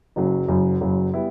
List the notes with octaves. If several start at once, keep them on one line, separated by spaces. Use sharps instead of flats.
F#1 F#2 C#3 F#3
F#1 F#2 C#3 F#3
F#1 F#2 C#3 F#3
G3 B3 E4